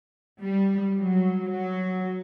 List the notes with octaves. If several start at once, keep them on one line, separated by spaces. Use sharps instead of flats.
G3
F#3
F#3